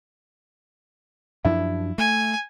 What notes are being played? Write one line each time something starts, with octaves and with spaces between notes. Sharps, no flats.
F#2 F3 D4 E4
A3 G#5